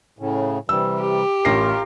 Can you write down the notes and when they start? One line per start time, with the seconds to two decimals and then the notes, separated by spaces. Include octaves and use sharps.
0.19 A2 C#3
0.69 C3 E3 G3 E6
1.02 G4
1.45 A1 F4 A#4 A#6 C7